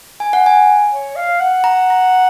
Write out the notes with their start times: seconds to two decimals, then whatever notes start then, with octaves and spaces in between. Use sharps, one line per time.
0.20 G#5
0.33 F#5
0.46 G#5
0.92 C#5
1.16 F5
1.40 F#5
1.64 A#5
1.90 A#5